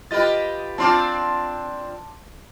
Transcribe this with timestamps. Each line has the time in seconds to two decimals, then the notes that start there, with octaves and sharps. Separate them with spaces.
0.11 F4 G4 B4 D#5 A6
0.78 C4 D4 F4 A5 C6 D6